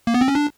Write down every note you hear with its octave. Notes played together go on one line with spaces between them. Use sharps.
A#3
B3
C4
C#4
D4